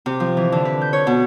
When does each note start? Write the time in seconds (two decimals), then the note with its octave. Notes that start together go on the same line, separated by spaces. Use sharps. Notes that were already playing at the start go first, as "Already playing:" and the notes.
0.06 C3
0.20 F3
0.37 E3
0.52 D3
0.65 B4
0.81 G6
0.93 C#5
1.07 B2